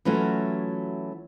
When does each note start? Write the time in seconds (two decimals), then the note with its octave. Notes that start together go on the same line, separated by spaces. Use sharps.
0.05 E3 F#3 A3 C#4 F4 F#4